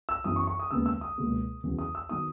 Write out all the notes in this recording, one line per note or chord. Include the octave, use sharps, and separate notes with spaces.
E6
F#2 E3 B3 D#6
C#6
C#6
D#6
D#2 C#3 G#3 B3 E6
E6
D#6
C#2 B2 A#3
E2 C#3 F#3 B3
D#6
E6
D#3 F#3 B3 D#6